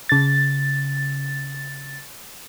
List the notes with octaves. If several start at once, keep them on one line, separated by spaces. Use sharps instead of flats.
C#3 A6